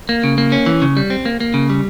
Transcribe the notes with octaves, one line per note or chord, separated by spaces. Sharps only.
A#3
C#3
A#3
C#4
E3
C#3
G3
C4
A#3
A#3
C#3
G3